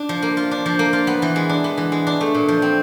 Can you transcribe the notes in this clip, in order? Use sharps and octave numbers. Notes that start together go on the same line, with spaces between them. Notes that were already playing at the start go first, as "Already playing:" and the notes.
Already playing: D4
F3
A#3
F4
D4
F3
A#3
F4
B3
E3
G#3
D4
B3
E3
G#3
D4
A3
A#2
F3
C4